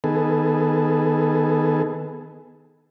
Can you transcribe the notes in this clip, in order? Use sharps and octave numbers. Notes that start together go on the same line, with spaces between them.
D#3 B3 G#4 A4